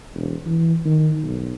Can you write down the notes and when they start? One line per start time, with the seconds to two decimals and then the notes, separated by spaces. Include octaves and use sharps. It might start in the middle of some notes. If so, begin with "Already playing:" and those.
0.15 E1
0.46 E3
0.85 D#3
1.23 B1